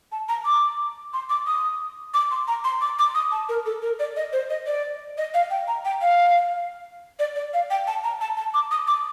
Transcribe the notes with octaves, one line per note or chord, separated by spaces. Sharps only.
A5
A#5
D6
C6
D6
D#6
D6
C6
A#5
C6
D6
D6
D#6
A5
A#4
A4
A#4
D5
D#5
C5
D#5
D5
D#5
F5
G5
A#5
G5
F5
D5
D5
F5
G5
A5
A#5
A5
A5
D6
D#6
D6